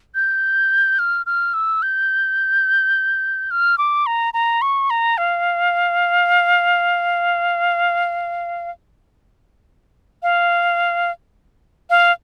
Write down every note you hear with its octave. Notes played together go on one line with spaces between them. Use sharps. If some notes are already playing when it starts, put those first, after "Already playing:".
G6
F6
F6
E6
G6
F6
D6
A#5
A#5
C#6
A#5
F5
F5
F5